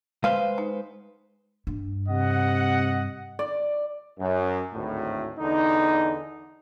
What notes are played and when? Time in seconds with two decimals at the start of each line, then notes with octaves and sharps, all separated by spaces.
0.24 G#3 B4 C5 F5
0.58 D#4
1.67 G2
2.08 C3 D#5 F#5
3.39 D5
4.19 F#2
4.74 G#1 D2 A2
5.39 E2 D3 D#4